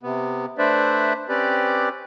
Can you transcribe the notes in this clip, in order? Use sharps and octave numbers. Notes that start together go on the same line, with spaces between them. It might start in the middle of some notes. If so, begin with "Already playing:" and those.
C3 B3
A3 D4 B4 C5 D5 E5
C4 C#4 G4 B4 D5